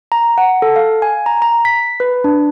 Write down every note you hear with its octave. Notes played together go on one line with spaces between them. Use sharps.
A#5
F#5
A4
F5
G#5
A#5
A#5
B6
B4
D4